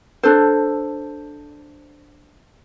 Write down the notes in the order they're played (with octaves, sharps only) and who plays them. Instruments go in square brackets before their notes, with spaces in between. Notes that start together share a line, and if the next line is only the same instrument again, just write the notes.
[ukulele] D4 A4 C5